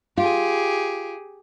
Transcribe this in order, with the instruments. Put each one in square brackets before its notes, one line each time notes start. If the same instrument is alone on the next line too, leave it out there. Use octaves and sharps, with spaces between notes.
[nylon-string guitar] F4 [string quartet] G4 G#4